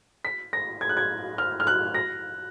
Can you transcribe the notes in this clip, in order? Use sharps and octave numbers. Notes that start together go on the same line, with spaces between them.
B6
A#6
G#6
F#6
G#6
F6
F6
F#6
A#6